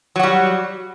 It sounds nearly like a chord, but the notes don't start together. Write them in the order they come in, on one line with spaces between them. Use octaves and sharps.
F#3 F#4 G3